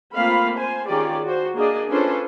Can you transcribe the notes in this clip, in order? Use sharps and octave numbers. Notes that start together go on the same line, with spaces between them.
A3 A#3 C4 F4 F5 B5
C5 G#5
D#3 C#4 F4 G4 G#4 D5
F#4 C5
A#3 D4 G#4 D5 D#5
C#4 D4 F4 A4 B4 C5